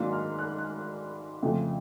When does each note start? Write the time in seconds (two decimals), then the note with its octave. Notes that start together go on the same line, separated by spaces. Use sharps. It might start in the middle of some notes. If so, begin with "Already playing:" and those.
Already playing: G#2 D#3 F#3 A#3 D4
0.13 F6
0.39 F#6
0.58 F#6
0.64 F6
1.43 F2 C#3 F3 A3